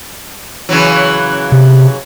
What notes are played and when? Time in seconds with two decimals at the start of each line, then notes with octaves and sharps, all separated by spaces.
0.69 C#3 E3 F#3
1.52 C3